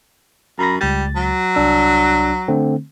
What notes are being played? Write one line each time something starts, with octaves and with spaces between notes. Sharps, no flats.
F#2 A#5 B5 A#6
C#2 G3 A6
F#3
C2 D4 E6
D3 A3 C4